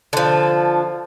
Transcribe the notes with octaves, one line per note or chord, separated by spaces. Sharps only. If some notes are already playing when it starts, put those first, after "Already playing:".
D3 F3